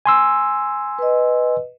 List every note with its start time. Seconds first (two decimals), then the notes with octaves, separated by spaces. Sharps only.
0.06 G#5 C6 E6
0.99 B4 D#5